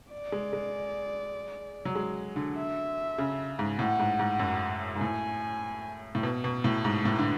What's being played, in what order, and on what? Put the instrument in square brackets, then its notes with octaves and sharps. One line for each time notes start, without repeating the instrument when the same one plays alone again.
[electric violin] D5
[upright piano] G#3
G#3
F#3
G#3
D3
[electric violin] E5
[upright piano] C#3
G#2
[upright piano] A2 [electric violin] F#5
[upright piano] G#2
G#2
F#2
G#2
[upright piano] A2 [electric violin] G#5
[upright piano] A2
B2
B2
A2
G#2
A2
D3